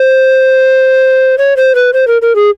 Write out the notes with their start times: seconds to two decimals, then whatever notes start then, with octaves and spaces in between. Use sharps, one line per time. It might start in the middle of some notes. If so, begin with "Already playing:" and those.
Already playing: C5
1.38 C#5
1.57 C5
1.75 B4
1.93 C5
2.07 A#4
2.22 A#4
2.36 G#4